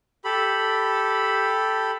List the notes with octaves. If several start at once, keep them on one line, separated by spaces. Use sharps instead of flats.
G4 A4 B5